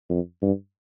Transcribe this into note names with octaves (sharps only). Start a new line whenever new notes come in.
F2
G2